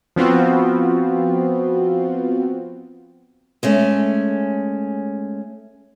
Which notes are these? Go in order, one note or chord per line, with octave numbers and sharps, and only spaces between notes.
F3 B3 C4 F4 F#4
G#3 A3 C#4